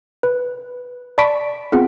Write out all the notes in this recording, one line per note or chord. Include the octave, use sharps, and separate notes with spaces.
B4
D5 A5 B5 C#6 B6 D7
B3 C4 F4 G#4 F#5